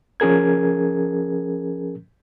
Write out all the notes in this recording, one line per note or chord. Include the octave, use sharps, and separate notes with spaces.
F3 C#4 G#4 A#4 G#6